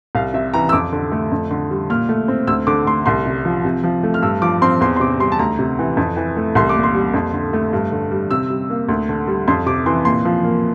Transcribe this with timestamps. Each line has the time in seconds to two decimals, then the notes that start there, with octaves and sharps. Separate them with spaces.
0.15 C2 F5
0.34 C3 E5
0.54 E3 A#5
0.69 E6
0.72 F2 D6
0.92 D3
1.12 A3
1.32 F2
1.51 D3
1.71 G3
1.90 A#2 F6
2.09 A3
2.28 C4
2.47 D2 E6
2.67 D3 D6
2.86 A3 C6
3.06 C2 C6
3.26 C3
3.45 F3
3.65 C3
3.84 F3
4.03 A3
4.14 F6
4.23 G2 E6
4.42 F3 D6
4.62 C4 C6
4.81 E2 C6
4.96 C6
5.00 C3 D6
5.20 G3 C6
5.32 A5
5.39 D2 A#5
5.59 C3
5.79 E3
5.97 F2
6.17 E3
6.37 A3
6.55 C2 C6
6.69 D6
6.76 A#2
6.84 C6
6.94 G3
7.14 F2
7.34 D3
7.53 A3
7.73 G2
7.92 D3
8.11 G3
8.31 C3 E6
8.50 G3
8.70 A#3
8.89 D2
9.09 D3
9.27 G3
9.48 F2 C6
9.66 C3 D6
9.86 E3 C6
10.05 A#2 C6
10.25 F3
10.44 A#3